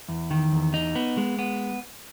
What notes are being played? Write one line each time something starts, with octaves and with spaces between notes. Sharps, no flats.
E2
D#3
E2
D#4
B3
G#3
B3